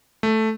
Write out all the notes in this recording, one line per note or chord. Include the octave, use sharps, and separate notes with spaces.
A3